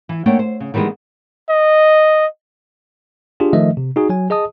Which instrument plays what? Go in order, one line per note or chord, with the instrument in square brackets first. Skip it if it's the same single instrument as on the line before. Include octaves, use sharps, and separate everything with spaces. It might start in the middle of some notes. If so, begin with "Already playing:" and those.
[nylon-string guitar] E3
A3 A#3 D4 C#5 F#5 G5
C5
C#3
D#3 E3 G3 G#3 B3
[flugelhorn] D#5
[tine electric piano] D4 F4 G4 G#4
D#3 F3 A3 D#5 E5
C3
D#4 F#4 G#4
F#3 G#5
G#4 D#5 A5 D#6